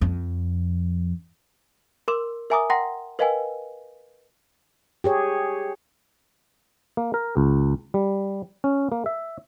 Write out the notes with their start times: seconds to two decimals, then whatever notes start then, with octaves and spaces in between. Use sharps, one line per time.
0.01 F2
2.08 A#4 C6 D6 E6 E7
2.50 A#4 E5 G#5 A#5 D6 D#6
2.70 F#5 G5 A#5 C6 A#6
3.19 A#4 B4 D#5 F5 G5 G#5
5.04 G4 G#4 C#5
6.97 A#3
7.14 A#4
7.37 C#2
7.94 G3
8.64 C#4
8.92 A#3
9.06 E5